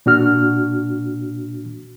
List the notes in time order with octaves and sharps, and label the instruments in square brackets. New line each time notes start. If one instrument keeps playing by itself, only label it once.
[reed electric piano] A#2 D4 F#4 F6